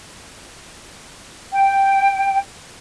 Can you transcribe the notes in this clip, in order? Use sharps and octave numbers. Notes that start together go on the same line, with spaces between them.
G5